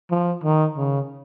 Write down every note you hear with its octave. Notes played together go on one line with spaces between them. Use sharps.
F3
D#3
C#3